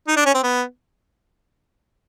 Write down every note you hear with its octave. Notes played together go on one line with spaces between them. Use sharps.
D#4
D4
C#4
C4
B3